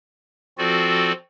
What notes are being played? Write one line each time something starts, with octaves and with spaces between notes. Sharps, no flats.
F3 C4 F4 F#4 A4 D5